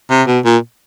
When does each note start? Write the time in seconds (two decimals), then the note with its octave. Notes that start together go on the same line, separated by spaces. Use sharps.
0.11 C3
0.27 B2
0.45 A#2